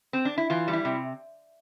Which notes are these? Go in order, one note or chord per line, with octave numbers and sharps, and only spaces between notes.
C4
D4
E4
E3 F4
G3
E4
C3